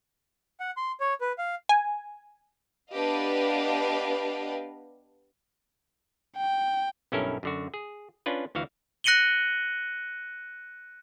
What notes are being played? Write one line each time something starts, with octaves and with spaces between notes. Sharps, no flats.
F#5
C6
C#5
B4
F5
G#5
B3 D4 G4 B4 D#5 F5
G5
B1 G2 C#4 E4 A4 A#4
F#2 D3 F#4
G#4
C#4 D4 F4 B4
D2 E3 F#4 F5
F#6 A#6 C#7 D#7 F#7 G7